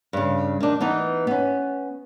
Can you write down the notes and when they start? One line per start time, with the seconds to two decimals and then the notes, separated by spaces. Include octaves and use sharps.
0.13 G2 C#3
0.60 D#3 D4
0.80 E3 B3 D#4
1.27 B3 C#4